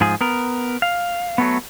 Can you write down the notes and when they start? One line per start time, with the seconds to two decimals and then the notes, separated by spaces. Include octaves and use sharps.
0.01 G#2 F3 G#4
0.21 B3 A#4
0.82 F5
1.38 F#3 A3 B3